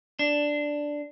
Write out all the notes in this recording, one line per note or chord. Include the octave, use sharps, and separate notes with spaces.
D4